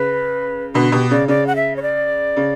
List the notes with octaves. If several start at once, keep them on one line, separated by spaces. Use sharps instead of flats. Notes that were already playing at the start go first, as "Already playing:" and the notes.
Already playing: C#3 B4
B2 D3 F#4
B2 G4
C#3 D5
C#3 D5
F#5
E5
C#5
D5
C#3